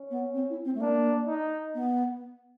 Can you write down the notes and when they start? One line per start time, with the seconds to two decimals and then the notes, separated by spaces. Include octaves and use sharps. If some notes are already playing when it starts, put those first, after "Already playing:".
Already playing: C#4
0.10 B3
0.33 C4
0.49 E4
0.64 C4
0.74 A3
0.80 A#3 D4
1.27 D#4
1.74 B3